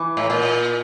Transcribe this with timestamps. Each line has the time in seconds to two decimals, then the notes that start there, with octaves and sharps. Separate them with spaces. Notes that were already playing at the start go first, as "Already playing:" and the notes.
Already playing: E3
0.17 A2
0.30 A#2